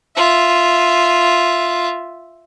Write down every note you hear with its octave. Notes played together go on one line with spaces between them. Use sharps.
F4 E5